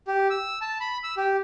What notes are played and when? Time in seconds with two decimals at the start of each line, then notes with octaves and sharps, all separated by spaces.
0.07 G4
0.30 E6
0.61 A5
0.80 B5
1.04 E6
1.17 G4